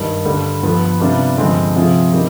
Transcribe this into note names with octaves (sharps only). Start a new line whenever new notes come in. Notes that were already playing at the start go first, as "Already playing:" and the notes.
Already playing: G2 D#3 G3
G2 D3 G3
G2 F3 B3
C3 G3 B3 D4 F4
G2 D3 F3 G#3 C4
C3 F3 C4 F4 G#4
D#3 G3 C4 G4